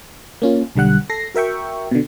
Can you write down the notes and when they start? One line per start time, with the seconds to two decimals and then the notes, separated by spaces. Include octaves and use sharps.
0.42 A#3 C#4 F4
0.75 B1 D3 G3 F#5 F#6
1.10 A4 A#6 C7
1.35 F#4 A#4 E5 G5 C#6
1.91 B2 D3